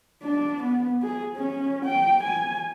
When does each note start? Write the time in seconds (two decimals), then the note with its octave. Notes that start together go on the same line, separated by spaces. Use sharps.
0.23 D4
0.63 B3
1.03 G#4
1.36 C#4
1.85 G5
2.23 G#5